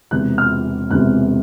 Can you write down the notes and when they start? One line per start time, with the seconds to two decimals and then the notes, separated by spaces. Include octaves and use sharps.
0.11 E1 E2 C3 F#6
0.38 F6
0.91 E1 E2 C3 F#6